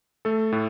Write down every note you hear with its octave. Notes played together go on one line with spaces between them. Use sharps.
A3 A4
A2